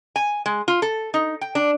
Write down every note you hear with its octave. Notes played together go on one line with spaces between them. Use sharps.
G#5
G#3
F4
A4
D#4
G5
D4